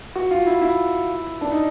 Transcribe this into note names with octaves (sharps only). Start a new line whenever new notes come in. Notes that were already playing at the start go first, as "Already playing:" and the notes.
F#4
F4
E4
E4
D4
D#4